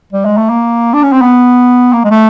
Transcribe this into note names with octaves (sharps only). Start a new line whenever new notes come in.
G3
G#3
A3
A#3
D4
C#4
C4
B3
A#3
G#3
A3